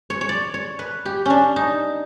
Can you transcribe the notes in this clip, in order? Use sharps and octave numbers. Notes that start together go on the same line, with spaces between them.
C#5
C#5
D5
C#5
B4
G4
C#4 D4
D#4